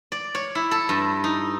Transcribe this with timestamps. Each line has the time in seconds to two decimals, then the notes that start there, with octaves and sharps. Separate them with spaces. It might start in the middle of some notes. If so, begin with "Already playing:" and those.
0.12 D5
0.35 C#5
0.55 E4
0.71 A4
0.89 G2
1.24 D#4